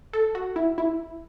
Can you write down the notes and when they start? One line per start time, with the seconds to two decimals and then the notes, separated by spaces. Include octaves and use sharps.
0.13 A4
0.35 F#4
0.56 E4
0.78 E4